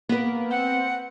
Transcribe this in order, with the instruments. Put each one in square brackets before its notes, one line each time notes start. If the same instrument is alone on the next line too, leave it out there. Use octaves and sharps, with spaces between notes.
[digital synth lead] A#3 [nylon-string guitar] B3 B4
[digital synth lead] C4 [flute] F#5